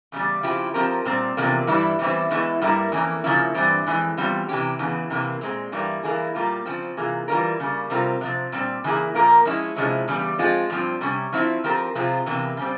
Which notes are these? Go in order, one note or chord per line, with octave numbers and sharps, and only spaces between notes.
E2 C#3 G3
C#3 F3 C4 E4 G4
F3 C4 G4 A#4
A#2 G3 C4
E2 C3 F3 A#3
G2 E3 G3 E4
E2 E3 G3 C4 E4
E2 E3 G#3 E4
G2 G3 A#3 E4 A#4
F2 E3 A#3 C#4
C#3 F3 A#3 C#4 E4
G2 E3 G3 C4
F2 C#3 E3 G#3
E2 C3 G3 C4 F4
C3 E3 G3 C#4 G4
E2 C#3 E3
C3 E3 A#3
A#2 G#3 C4
G2 E3 G3 A#3 E4
E3 G3 A#3 E4 G#4
A#2 G3 A#3 F4
C#3 F3 C4
C3 E3 A#3 F4 G#4
E3 G3 C#4 F4 A#4
C#3 G3 A#3
C3 G3 C4 F4 A#4
C3 F3 C4
A#2 G3 C4
C#3 E3 A#3 E4 G#4
A#2 F3 A#3 F4 A#4
F3 G#3 C#4 E4 G#4
C3 F3 G#3 C#4 E4
E2 C#3 G3
F3 G#3 C4 F4
G2 F3 C4
C3 G3 C#4
F3 C4 E4
F3 C4 G4 A#4
C3 F3 C4 F4 G#4
E2 C3 E3 A#3
C#3 G3 C4